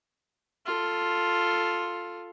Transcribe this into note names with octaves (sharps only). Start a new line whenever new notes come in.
F4 A4